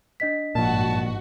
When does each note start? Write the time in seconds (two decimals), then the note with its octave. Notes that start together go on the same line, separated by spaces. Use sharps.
0.20 D4 D#5 B6
0.55 G#1 G2 A#2 F3 F#4 A5